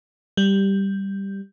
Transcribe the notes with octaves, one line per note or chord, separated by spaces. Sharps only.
G3